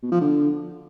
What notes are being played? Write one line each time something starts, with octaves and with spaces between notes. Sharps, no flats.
B2
F3
D3